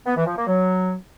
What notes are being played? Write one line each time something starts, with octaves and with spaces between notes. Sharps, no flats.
B3
E3
F3
A#3
F#3